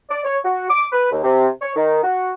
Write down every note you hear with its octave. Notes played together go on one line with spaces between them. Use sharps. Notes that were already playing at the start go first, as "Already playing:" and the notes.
D5
C#5
F#4
D6
B4
D#2
C3
C#5
D#3
F#4